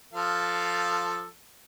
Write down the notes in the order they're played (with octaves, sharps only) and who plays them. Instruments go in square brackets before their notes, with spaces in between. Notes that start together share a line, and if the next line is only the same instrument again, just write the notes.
[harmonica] F3 A4 F5